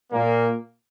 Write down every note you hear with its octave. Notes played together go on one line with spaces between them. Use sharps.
A#2 A#3